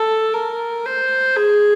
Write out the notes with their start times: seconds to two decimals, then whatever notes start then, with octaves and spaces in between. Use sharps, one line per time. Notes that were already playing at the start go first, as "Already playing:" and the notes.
Already playing: A4
0.34 A#4
0.86 C5
1.36 G#4